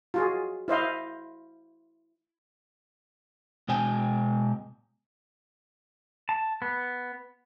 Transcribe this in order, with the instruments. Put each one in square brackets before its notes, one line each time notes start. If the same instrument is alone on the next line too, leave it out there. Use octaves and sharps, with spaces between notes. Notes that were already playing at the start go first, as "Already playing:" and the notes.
[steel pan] F4 F#4 G#4
E4 C5 D#5 F5
[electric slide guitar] B2 G#3 G5 G#5
[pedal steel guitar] A5
B3